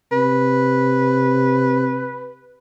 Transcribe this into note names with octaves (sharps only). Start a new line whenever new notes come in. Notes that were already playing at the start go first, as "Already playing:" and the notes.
C3 B4